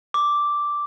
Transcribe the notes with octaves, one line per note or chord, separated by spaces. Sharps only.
D6